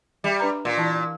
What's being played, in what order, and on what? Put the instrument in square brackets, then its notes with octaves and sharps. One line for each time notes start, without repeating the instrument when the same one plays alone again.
[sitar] G3 [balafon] E5
[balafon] D4 B4 A#5
[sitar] A#2
[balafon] E3 E4 A5